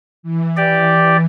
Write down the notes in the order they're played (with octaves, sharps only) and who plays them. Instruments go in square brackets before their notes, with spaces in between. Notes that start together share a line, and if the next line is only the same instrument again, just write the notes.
[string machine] E3
[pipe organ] G4 D5